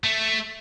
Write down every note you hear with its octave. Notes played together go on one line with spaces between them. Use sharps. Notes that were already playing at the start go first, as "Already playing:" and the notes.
A3